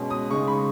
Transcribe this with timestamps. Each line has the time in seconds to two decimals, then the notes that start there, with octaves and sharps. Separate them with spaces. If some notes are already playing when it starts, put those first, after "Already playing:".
Already playing: B2 G#3 C#4
0.10 D#6
0.30 C#3 G#3 D#4 C#6
0.47 B5